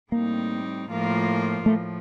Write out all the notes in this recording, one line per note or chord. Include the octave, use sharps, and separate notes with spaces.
A2 G3 A#3 C4 D#4
A2 F3 A#3 F4 A#4
A2 F3 A3